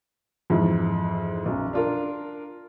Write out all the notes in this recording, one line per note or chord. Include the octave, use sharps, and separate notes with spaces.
F2 G#2 E3
B1 F#2
D4 F4 A#4